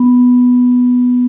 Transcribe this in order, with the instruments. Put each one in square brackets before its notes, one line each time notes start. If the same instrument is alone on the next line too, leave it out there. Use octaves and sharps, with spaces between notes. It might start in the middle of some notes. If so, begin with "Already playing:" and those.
Already playing: [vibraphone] B3